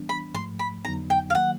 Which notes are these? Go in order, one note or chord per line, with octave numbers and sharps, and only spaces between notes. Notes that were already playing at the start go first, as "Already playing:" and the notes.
Already playing: E3 G3 B3 D4
B5
G#2 F3 A3 C6
B5
F2 D3 F#3 B3 D#4 A#5
G5
F5
D#3 F#3 A#3 F#5